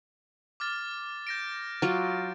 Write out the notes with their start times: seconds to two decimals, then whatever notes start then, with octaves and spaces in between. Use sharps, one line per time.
0.60 D6 F6 A6
1.27 G6 A#6 D7
1.82 F#3 F4